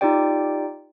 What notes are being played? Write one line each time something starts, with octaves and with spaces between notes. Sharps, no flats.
D#4 F4 G4 D5 G5